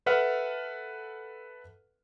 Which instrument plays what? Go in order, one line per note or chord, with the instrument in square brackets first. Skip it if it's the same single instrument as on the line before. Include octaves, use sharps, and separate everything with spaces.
[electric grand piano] A4 B4 E5 F#5 F6